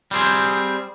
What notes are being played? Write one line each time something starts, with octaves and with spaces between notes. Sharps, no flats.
G3 C4 G#4